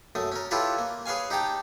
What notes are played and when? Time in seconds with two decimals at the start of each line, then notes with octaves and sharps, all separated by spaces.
0.15 F#2 A3 D#6
0.32 C#4 A#4
0.51 E4 F4 G4 A4 B4 C#5
0.78 A#3
1.06 G#4 B4 C#5 F5 G#5
1.30 D#4 G4 G5 A5 A#5